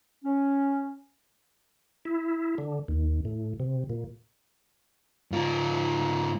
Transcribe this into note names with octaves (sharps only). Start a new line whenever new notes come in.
C#4
E4
D3
D#2
A2
C3
A#2
G#2 F4